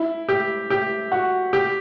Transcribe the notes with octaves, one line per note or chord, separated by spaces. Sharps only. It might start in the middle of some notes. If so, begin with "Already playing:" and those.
Already playing: E4
G4
G4
F#4
G4